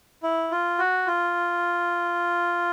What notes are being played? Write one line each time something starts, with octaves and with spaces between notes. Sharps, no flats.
E4
F4
F#4
F4